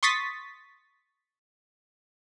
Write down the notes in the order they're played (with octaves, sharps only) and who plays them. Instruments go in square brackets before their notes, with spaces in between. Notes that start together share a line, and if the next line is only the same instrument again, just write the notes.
[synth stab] C6 C#6 D#6 A6 B6